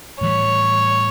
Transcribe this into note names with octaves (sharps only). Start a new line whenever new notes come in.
A2 E3 G3 C#5